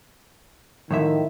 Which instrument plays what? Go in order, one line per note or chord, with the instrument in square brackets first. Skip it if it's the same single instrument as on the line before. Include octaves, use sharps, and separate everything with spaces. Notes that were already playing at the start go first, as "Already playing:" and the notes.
[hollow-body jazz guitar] A2 F3 E5 [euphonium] D#3